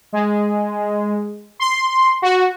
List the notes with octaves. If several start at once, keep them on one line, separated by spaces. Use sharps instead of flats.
G#3
C6
F#4